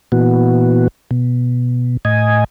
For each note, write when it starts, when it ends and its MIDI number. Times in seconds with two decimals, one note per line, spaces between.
0.12 0.88 46
0.12 0.88 52
0.12 0.88 59
0.12 0.88 66
1.11 1.97 47
2.05 2.44 45
2.05 2.44 75
2.05 2.44 80